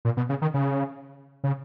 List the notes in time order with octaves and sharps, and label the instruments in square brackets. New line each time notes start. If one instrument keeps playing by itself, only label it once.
[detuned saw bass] A#2
B2
C#3
D#3
C#3
C#3